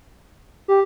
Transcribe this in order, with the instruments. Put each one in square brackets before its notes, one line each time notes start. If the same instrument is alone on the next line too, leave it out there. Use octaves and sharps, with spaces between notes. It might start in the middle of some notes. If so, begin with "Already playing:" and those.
[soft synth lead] G4